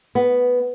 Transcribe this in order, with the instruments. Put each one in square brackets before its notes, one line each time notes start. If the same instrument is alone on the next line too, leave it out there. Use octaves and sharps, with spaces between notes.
[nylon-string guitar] B3